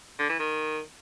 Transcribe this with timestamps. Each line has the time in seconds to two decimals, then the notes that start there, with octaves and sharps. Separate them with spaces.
0.19 D3
0.29 E3
0.39 D#3